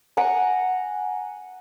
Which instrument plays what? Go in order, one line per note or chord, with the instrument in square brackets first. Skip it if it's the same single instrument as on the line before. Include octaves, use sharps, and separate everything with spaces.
[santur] F#5 G#5 A#5